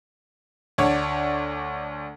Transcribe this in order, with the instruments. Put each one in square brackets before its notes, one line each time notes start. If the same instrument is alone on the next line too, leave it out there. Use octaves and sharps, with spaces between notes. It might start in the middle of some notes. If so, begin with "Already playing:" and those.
[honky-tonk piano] D2 D4 C#5